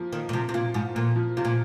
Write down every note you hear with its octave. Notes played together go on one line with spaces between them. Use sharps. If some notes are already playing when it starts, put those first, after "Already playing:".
Already playing: F3 A#3
D#3 A#3
A#2
C3 F3
C3
A#2 F4
G#2 F3
A#2 A#3
F3
C3 F4
A#2